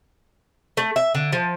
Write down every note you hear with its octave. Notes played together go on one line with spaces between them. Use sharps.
A3
E5
D3
F3